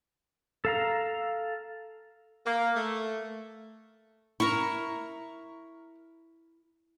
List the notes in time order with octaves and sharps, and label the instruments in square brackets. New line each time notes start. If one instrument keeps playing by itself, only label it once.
[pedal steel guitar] A4 F5 A#5
[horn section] A#3
A3
[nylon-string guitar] E4 [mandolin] A#4 C#6